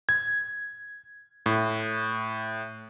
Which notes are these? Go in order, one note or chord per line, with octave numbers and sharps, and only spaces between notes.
G#6
A2